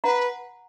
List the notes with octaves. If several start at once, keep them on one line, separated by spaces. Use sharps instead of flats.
B4 F#5 A#5